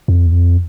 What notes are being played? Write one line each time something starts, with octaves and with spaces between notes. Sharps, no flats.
F2
E2
F2